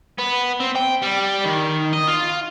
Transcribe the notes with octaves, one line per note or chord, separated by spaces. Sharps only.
B3
C4
G5
G3
D#3
D#5
F4